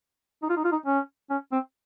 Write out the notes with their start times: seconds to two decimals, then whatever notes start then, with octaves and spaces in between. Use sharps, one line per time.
0.43 D#4
0.50 F4
0.57 D#4
0.64 F4
0.72 D#4
0.86 C#4
1.30 C#4
1.52 C4